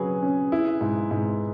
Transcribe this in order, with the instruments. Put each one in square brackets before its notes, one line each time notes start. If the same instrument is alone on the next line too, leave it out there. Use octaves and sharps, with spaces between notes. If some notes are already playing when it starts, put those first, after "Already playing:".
Already playing: [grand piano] C#3 F#3 [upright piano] G#4 B4
[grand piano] C#4
E4
G#2
G#2